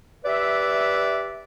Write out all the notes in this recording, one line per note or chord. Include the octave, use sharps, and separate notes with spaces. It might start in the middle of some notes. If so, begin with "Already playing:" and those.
G4 B4 D5 E5